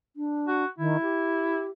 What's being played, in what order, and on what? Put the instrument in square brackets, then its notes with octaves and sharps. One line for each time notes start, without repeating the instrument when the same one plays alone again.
[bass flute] D4
[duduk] F#4
[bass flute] D#3 [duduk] E4
[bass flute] G4